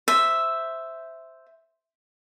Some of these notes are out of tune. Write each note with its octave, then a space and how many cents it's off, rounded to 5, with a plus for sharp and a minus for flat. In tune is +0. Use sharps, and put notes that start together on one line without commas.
C5 -5 E5 +0